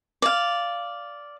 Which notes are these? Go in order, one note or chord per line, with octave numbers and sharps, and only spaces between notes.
D5 F5